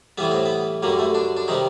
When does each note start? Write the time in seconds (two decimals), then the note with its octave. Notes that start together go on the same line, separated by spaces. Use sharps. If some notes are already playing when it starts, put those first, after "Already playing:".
0.18 A2 E3 G3 B3
0.31 C4
0.45 B3
0.83 F#2 D3 G3 A#3
0.99 A3
1.15 D4
1.37 D4
1.48 C3 D#3 G3 D#4